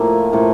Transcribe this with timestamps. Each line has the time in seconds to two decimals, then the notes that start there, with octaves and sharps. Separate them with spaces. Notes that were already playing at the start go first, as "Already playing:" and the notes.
Already playing: A2 F3 A#3
0.33 A2 F3 A#3